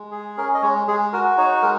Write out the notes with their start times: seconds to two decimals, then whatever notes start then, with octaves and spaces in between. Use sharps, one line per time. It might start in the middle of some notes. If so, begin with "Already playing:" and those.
Already playing: G#3
0.11 G#4
0.37 C#4 A#4
0.54 D#5
0.62 G#3 C#5
0.87 G#3 G#4
1.13 F#4 A#4
1.37 D#4 C#5
1.62 G#3 A#4